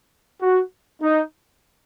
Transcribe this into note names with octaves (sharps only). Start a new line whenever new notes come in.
F#4
D#4